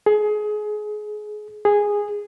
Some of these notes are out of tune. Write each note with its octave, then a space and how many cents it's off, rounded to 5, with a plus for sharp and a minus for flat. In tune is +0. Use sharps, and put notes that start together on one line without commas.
G#4 +25
G#4 -10